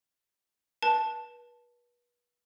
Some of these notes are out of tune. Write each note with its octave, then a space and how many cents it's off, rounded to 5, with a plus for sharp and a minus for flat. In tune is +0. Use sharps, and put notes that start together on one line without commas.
B4 -35 A5 -5